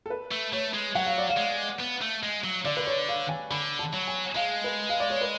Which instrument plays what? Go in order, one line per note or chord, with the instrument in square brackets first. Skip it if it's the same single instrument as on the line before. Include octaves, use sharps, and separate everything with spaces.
[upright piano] A4
B4
[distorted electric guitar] A3
[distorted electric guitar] A3 [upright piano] C#5
[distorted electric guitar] G#3
[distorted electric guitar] F#3 [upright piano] F#5
[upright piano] F5
D5
F5
[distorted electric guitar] G#3
B3
A3
G#3
F#3
[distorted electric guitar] D3 [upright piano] D5
[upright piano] B4
C#5
F5
G#5
[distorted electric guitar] D3 [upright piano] B5
[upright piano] A5
[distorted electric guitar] F#3
[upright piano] G#5
[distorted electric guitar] G#3 [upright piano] F5
[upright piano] B4
F5
D5
C#5
B4